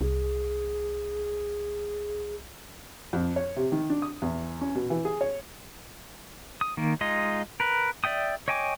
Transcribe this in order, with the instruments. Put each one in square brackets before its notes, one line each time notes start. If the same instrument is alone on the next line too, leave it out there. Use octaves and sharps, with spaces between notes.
[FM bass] C2 [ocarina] G#4
[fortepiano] F2
C#5
C3
D#3
D4
D#6
E2
C#4
B2
E3
G#4
C#5
[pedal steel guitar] D#6
D#3 A#3
G#3 D#4 F4 D#5
A#4 B4
D5 E5 G5 D#6
C#5 D#5 G5 G#5 D6